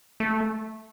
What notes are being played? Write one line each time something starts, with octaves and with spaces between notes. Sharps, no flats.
A3